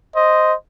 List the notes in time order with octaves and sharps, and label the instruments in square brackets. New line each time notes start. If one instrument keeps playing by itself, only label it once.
[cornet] C5 [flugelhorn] D#5